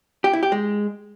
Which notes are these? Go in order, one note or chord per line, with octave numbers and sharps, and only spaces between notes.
G4
E4
G4
G#3